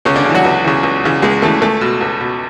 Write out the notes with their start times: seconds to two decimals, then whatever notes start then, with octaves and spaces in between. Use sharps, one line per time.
0.05 C#2 C#3 C#4
0.16 D3 D4
0.25 C#3 E3
0.35 F#3 F#4
0.44 C#2
0.64 C#3 E3
0.83 C#2
1.04 C#3 E3
1.22 C#2 G#3 G#4
1.42 C#3 E3 A3 A4
1.61 C#2 A3 A4
1.81 B2
2.01 C#2
2.21 B2